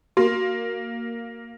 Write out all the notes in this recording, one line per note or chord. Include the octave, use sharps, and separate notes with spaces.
A#3 F#4